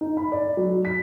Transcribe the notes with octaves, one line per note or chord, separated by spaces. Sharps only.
D#4
B5
D5
F#3
B6